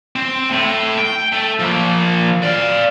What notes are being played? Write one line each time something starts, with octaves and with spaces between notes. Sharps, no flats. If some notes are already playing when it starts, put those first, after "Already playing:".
C4
A2
G5
A3
F3 A#3
D5 F5